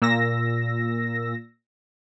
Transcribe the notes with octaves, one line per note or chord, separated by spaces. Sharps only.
A#2 E6 A#6